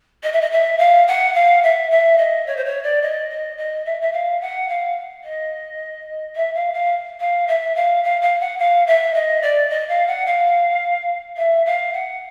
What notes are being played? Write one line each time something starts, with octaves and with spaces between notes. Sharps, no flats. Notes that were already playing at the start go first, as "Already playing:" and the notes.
D#5
E5
D#5
E5
F5
F#5
F5
E5
E5
D#5
C#5
C5
C#5
D5
D#5
D#5
D#5
E5
E5
F5
F#5
F5
D#5
E5
F5
F5
F5
E5
F5
F5
F5
F#5
F5
E5
D#5
D5
D#5
F5
F#5
F5
E5
F5
F#5